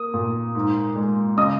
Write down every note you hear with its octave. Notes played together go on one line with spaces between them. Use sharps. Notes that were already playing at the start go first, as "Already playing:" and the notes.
Already playing: A#3 D#6
A#2
G#2
G#3
C#3 D#5 D#6